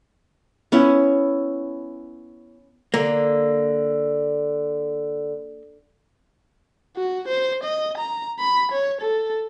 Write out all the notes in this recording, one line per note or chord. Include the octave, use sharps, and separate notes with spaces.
B3 C#4 E4
D3 A#3
F#4
C5
D#5
A#5
B5
C#5
A4